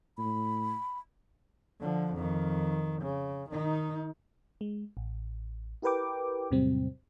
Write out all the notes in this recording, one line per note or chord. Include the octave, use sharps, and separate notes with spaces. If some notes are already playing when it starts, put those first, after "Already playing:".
A2 B5
D3 F3
F2 D#3
C#3
D#3 D#4
G#3
A1
E4 G4 A#4 B4 G5 D6
E2 A2 C3 F#3 G3 C4